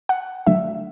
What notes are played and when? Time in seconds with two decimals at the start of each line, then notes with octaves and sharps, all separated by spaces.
0.09 F#5
0.46 D3 F#3 A3 D4 E5